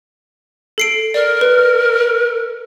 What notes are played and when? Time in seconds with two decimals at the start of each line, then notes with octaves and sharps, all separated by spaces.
0.78 A4 C7 D7
1.14 A#4 D5
1.41 B4